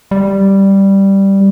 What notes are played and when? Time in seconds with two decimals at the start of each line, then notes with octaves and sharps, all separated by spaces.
0.11 G3